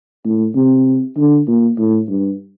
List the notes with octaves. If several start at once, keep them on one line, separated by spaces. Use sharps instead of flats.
A2
C3
D3
A#2
A2
G2